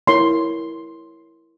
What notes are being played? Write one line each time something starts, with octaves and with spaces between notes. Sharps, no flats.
E4 A#4 C#5 C6